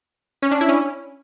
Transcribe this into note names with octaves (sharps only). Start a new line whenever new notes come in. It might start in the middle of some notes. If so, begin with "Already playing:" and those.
C#4
D4
E4
C#4